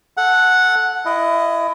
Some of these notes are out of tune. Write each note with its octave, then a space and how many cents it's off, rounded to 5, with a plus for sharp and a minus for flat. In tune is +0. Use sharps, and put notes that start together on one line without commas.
A4 -10 F#5 -5
E4 +25 D#5 +0